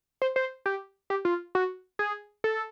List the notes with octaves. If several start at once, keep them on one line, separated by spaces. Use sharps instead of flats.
C5
C5
G4
G4
F4
F#4
G#4
A4